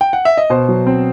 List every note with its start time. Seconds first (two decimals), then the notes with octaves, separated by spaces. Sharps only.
0.01 G5
0.13 F#5
0.25 E5
0.38 D#5
0.50 B2 C5
0.69 F#3
0.87 C4